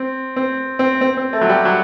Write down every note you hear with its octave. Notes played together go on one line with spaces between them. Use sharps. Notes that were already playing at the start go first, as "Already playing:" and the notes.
Already playing: C4
C4
C4
C4
C4
A3
F#3
G3
F#3